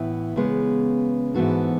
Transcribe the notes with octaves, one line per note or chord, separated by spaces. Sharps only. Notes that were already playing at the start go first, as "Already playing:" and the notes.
Already playing: A2 E3 B3 E4
C#3 G#3 B3
G#2 E3 B3 F#4 A4